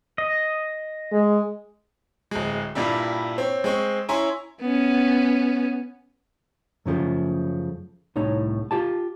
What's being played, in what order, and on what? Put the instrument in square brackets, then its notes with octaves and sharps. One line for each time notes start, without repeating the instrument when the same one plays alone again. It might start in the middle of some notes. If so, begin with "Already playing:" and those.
[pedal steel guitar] D#5
[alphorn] G#3
[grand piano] D1 G#3
G2 A#2 G3 E4
C4 C#5
G#3 C4 C#6
C#4 E4 G#5 A#5 C6 C#6
[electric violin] B3 C#4
[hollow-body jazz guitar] F#2 C#3 F3 A3
C2 A2 D#4 C#5
F4 G4 A5